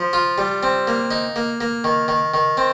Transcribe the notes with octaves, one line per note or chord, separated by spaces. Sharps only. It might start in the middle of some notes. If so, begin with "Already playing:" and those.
Already playing: F3
F4
G3
C4
A#3
D#4
A#3
A#3
D#3
D#3
D#3
C4